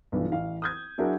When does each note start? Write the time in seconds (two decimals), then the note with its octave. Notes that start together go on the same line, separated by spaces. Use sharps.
0.12 B1 G2 E3 F3
0.32 A1 F5
0.62 D#6 G6 G#6
0.98 F#3 D4 E4 F#4 G#4 A#4